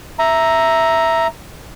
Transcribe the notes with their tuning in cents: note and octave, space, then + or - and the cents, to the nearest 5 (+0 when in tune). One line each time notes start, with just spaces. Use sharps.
E5 +0 A#5 +0